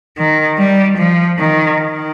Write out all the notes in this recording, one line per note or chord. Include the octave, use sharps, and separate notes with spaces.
D#3
G3
F3
D#3
D#3